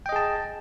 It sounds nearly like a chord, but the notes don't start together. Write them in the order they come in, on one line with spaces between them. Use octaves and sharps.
G5 D#5 G#4 A5